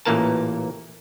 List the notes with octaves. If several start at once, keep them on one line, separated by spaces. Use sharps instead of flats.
A1 A#2 E3 A#3 A#4 A5